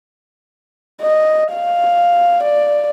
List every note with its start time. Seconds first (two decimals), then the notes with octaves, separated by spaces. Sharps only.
1.01 D#5
1.53 F5
2.43 D5